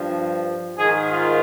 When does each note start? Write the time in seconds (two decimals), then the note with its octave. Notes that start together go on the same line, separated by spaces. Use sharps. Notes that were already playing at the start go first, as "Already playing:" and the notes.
Already playing: G2 F3
0.77 G#2 D#3 G#4
1.10 F4